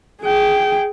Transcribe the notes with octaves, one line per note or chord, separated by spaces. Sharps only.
G#4 G5